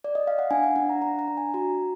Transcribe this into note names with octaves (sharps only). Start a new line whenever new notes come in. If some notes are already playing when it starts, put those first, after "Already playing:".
D5
D#5
F5
F#5
D4 G#5
F#5
D4 F#5
A#5
D4 A#5
A#5
D4
G#5
F#4 A#5